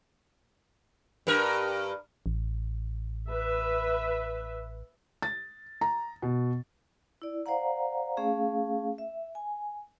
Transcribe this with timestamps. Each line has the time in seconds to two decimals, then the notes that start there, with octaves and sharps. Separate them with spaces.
1.27 G2 A#4
2.26 A1
3.30 B4 E5
5.22 A6
5.81 A#5
6.22 B2
7.22 E4 D5
7.46 C5 D5 F5 F#5 A#5
8.17 A3 C#4 G#4 F5
8.98 E5
9.35 G#5